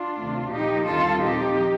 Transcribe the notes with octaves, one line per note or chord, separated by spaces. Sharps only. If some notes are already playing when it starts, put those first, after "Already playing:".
Already playing: D4 F4
D2 C3 D#3 A3
A#2 F3 A#3 D#4 G4
D#2 D3 G3 C4 F4 A4
A#2 F3 C4 D#4 G4